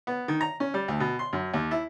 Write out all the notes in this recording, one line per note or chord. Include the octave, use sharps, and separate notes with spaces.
B3
D#3
A#5
C#4
G3
D2
B2
C6
F#2
D#2
E4